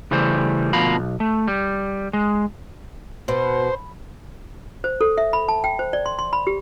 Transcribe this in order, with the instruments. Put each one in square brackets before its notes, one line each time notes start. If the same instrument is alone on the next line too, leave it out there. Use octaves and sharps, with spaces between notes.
[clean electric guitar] C#3 E3 G3 A3 C5
D2 B2 F3 A#4 F5 B5
B1
A3
G3
G#3
[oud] B2 [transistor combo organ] C5
[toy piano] C5
A4
E5
B5
A5
G5
C5
D5
C6
C6
B5
G4